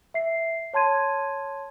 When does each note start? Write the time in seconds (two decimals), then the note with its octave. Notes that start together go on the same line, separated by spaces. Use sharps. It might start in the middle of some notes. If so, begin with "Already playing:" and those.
0.14 E5 C7
0.73 C#5 A5 C6 G#6 D#7